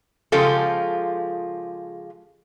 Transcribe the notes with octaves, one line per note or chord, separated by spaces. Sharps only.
C#3 F3 G#3 F4 G4 A4